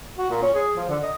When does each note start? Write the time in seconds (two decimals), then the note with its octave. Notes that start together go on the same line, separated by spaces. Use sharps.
0.17 F#4
0.30 A#2
0.42 C#4
0.55 G#4
0.75 F3
0.89 D3
1.03 D#5